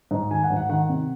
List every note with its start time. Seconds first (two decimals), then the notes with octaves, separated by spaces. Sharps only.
0.11 G#2
0.31 D#3 G#5
0.43 F#5
0.50 G#2
0.56 F#5
0.69 D#3 F#5
0.89 C3